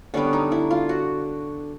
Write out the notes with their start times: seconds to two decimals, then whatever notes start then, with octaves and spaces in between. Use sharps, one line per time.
0.14 D3 G3 B3 C#4
0.33 D#4
0.52 E4
0.71 F4
0.89 F#4